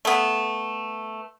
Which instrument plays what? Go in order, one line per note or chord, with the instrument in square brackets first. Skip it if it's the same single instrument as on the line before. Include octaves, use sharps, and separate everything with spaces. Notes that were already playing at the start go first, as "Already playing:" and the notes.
[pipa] A3 B3